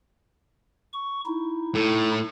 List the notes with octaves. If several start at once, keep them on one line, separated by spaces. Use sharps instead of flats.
C#6
D#4 E4
A2